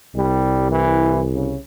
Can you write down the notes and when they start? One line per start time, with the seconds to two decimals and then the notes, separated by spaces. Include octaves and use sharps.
0.15 C2 G3
0.71 E3
1.34 C#3